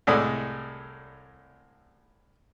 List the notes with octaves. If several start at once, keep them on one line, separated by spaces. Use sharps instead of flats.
C2 A2 G#3 A4 D5 D#6